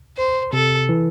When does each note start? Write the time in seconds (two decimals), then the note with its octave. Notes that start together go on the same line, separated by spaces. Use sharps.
0.17 C5
0.53 C3 A4
0.89 E3